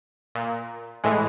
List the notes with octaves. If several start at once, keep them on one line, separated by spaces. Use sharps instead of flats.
A#2
A2 E3 G#3